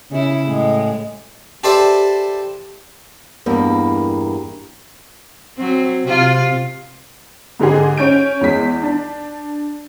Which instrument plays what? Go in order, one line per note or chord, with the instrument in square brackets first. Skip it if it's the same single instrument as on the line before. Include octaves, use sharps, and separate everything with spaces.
[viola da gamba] C#3 E4
A2 G#3
[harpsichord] G4 A4 B4 C5 D5 E5
[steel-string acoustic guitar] E2 G2 A#3
[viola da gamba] F#3 C4
C3 F4
[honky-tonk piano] G#2 D3 G#3 G4 G#4
C#4 C#5 G6 D7
E2 G#3 B6
D4